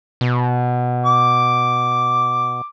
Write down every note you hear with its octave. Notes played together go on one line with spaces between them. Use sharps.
B2
D6